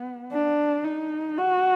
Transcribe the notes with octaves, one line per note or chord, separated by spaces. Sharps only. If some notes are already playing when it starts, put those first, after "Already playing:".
Already playing: B3
D4
D#4
F#4